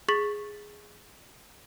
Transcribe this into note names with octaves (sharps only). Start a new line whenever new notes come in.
G#4 C#6 A6 B6 F#7